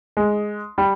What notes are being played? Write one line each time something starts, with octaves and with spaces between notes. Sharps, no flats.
G#3
G3